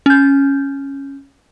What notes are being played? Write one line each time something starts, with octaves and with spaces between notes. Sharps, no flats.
C#4 G6